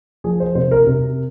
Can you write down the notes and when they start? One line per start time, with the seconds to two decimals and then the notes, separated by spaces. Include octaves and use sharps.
0.24 F3 G#4
0.40 C5
0.55 C3 C5
0.71 A#4
0.86 C3 A#4